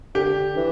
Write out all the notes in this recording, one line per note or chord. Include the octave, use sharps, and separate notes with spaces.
D3 G4
E3